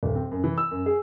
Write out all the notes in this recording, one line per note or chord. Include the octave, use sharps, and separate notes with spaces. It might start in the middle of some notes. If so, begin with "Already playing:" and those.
D1
C4
F#2
E3
E6
F#2
G#4